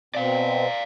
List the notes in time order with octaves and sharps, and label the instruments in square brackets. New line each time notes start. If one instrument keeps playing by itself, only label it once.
[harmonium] B2 C4 [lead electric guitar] D5 F5